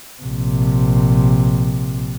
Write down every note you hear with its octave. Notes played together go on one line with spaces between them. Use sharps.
A#1 C3